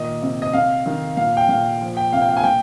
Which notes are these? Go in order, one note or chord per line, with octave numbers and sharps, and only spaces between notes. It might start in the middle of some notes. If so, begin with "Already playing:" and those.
Already playing: A#2 D#3 D#5
C3
D#5
C3 F5
D#3
A#2 F5
G5
A#2 F5
F3
G5
C3 F5
G5
F5
G#5
A#2 G5